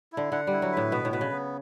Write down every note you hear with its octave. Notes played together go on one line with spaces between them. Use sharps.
D3 E4
D3 F#5
G3 E4
F#3
A2 B4
B2 B3
A2
B2 B4
C#3
B3